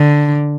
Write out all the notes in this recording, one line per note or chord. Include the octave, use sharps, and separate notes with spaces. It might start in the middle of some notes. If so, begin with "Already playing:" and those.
Already playing: D3